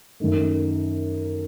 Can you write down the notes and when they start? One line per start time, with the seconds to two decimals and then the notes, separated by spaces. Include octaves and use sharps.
0.20 F#2 D#3 A3